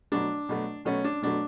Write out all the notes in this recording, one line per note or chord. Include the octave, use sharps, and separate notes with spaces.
B2 F#3 A3 D4
B2 F#3 A3
B2 F#3 A3 C#4
D4
B2 F#3 A3 D4